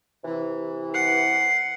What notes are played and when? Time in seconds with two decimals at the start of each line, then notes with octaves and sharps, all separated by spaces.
0.24 C3 E3
0.94 F#5 C7